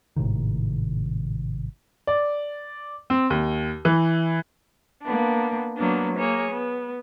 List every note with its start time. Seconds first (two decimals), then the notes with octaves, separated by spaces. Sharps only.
0.16 G#1 A2 C3 D#3
2.07 D5
3.10 C4
3.30 D#2
3.85 E3
5.03 A#3 B3 D4
5.76 F#3 A#3 B3 D4
6.19 A#3 G#4 C#5
6.51 B3